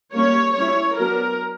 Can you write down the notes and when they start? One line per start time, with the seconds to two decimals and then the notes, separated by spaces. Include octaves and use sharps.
0.14 G3 A#3 C#4 C#5
0.56 G3 C#4 E4 C#5
0.98 F#3 B3 D4 A#4